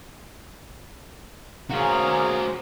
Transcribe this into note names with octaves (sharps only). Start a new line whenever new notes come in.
A#3 C#4 F#4 G#4 C5 A#5